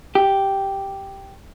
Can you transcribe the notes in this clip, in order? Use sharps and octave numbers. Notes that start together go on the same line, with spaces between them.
G4